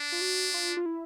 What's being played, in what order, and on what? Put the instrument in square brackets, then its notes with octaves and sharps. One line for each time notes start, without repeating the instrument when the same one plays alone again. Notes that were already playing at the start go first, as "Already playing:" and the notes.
Already playing: [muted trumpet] D4
[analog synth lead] F4
F#4
F4
F4
E4